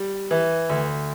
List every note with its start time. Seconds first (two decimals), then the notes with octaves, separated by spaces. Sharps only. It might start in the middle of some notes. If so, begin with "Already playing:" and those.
Already playing: G3
0.31 E3
0.69 D2